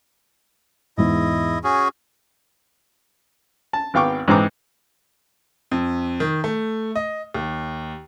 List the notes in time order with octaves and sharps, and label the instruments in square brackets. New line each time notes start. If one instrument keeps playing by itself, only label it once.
[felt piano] E2 G#2 [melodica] E4 D#5
[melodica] C#4 F#4 G#4
[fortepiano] A5
G#1 B3 F5 G5 C#6 D6
G#2 E3 G#3 C4 A#5 D6
[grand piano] F2
D#3
A3
D#5
D#2